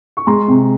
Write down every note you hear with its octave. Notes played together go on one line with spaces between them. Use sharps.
C#6
G#3 A#5 C6
C3